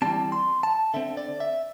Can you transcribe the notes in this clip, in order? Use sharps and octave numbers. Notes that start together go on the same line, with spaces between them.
E3 G3 C4 A5
C6
A5
D3 C4 E5
D5
E5